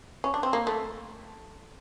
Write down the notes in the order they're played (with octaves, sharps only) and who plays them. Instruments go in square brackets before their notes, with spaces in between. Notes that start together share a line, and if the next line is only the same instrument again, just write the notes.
[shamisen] C#4
D4
C4
A#3
A3